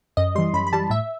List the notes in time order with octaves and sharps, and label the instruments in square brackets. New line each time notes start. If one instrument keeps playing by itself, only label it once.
[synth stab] F#2 D#5
E3 G3 C6
F#2 B5
B5
E3 G3 A5
A2 E5